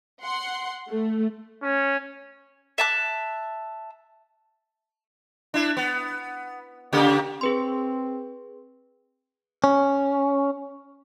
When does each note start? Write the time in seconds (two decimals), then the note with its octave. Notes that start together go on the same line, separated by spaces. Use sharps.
0.23 F#5 C6
0.90 A3
1.63 C#4
2.78 E5 A5 F#6
5.54 D4 E4
5.77 B3
6.93 C#3 A#3 G4
7.41 C4 G#4 B4 C6
9.64 C#4